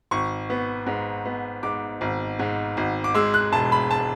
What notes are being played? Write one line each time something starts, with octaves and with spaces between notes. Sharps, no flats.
G#1 C#6
B3
G#2
B3
G#2 D6
G#1
G#2
G#1
D6
G#3 E6
F#6
E1 A5
B5
A5